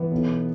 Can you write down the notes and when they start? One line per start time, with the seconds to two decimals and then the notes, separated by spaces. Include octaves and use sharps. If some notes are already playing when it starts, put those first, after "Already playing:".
Already playing: E3 B3
0.11 B1